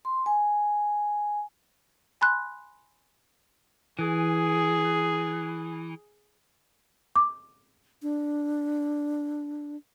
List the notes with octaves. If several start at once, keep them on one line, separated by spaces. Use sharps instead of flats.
C6
G#5
G#5 B5 C6 F#6
E3 G#4
D6
D4